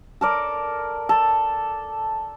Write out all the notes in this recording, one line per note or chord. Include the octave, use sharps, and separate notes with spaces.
A4 A#4 D5
A4